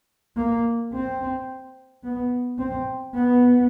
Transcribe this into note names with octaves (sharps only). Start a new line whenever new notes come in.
A#3
C4
B3
C4
B3